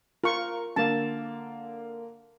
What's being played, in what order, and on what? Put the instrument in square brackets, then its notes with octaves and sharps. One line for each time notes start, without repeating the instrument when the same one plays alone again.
[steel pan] F4 C#6 [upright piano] A#4
[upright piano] D3 A#3 [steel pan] A5